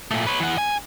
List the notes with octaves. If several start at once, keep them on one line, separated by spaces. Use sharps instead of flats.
A#2 A3
B4 C#5
E3 F#5
G#5